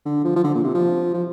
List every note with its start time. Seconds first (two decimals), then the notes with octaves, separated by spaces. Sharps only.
0.06 D3
0.24 F3
0.36 F3
0.44 D3
0.55 A#2
0.64 C3
0.75 F3
1.14 F3